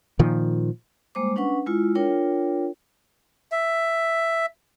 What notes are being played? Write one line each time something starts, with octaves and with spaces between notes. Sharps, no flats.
A#2 D#3 F3
G3 G#3 A#3 C5 D6
C#4 D4 B4 F#5 C#6
G#3 E4 F4
D4 F4 A#4 C#5 G5
E5